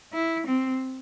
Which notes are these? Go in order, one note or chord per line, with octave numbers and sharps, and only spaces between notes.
E4
C4